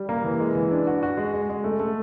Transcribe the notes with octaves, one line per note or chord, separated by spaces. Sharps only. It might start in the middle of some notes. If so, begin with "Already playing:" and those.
Already playing: G3
A#3
E3
G#3
E3
D4
F#4
F#4
G#3
G#3
G#3
A3
A3